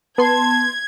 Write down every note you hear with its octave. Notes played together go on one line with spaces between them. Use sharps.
B3 A5 C6 G#6